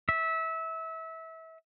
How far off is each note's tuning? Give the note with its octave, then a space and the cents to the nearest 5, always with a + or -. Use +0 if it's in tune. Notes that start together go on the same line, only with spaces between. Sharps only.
E5 -25